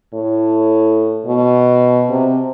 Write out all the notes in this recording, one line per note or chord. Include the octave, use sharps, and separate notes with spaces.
A2
B2
C3